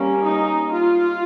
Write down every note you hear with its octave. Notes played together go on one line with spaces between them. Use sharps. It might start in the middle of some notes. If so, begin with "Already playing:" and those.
Already playing: G3 A#3 C#4
D#4
F4